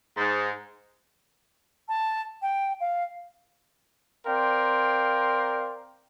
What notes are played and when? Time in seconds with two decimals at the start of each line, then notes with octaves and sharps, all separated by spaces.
0.17 G#2
1.89 A5
2.42 G5
2.81 F5
4.26 C4 A#4 D5 F5 G5 C6